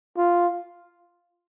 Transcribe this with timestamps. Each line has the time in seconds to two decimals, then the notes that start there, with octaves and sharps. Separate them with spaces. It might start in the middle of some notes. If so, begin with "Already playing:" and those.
0.17 F4